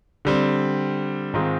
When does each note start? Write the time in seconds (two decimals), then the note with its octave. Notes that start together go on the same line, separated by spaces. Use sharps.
0.25 D3 G3 C4
1.34 G#2 D#3 G#3 C4 F4